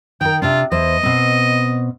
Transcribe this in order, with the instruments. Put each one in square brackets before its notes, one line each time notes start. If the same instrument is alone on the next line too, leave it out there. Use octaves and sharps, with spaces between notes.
[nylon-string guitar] D#3 A#4 [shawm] G5
[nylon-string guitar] C3 D4 [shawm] F4
[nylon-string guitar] E2 C5 [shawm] D#5
[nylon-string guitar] B2 C4